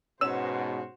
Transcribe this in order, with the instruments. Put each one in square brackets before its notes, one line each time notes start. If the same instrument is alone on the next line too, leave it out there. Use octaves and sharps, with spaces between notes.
[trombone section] G#2 B2 [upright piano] C#4 E7 [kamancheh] F#4 C5 [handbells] E6